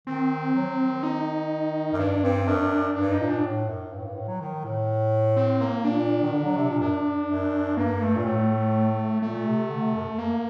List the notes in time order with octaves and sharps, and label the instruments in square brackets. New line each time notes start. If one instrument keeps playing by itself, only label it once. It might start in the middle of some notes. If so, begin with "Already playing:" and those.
[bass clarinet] D#3 [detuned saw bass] C4
[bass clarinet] F#3
D#3
[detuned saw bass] D#4
[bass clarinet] F#2
[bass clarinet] G2 [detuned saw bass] D4
[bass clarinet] G2 [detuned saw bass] C4
[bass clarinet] F#2 [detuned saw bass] D4
[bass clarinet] G2 [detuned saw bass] D4
[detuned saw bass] D#4
[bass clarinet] A#2
[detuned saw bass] D4
[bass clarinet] A2
F#2
G2
A2
G2
A2
F#3
D#3
A2
[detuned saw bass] C4
A#3
[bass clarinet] A#2 [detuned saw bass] D4
[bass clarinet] D#3
D3
F#3
C3
A#2
[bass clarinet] F#2 [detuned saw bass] D4
[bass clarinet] F#2
[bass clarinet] G2 [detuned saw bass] A#3
[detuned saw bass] A3
[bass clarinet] A#2
[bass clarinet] A2 [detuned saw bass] A3
[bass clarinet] A#2 [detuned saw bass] A3
[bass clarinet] C3
D3
C3
F#2
[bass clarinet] F#2 [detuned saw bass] A#3